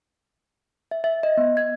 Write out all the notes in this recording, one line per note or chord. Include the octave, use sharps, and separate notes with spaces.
E5
E5
D#5
B3
G#6